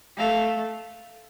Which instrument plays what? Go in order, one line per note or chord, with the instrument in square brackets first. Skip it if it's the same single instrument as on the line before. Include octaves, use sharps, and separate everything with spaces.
[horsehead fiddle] A3 [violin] F5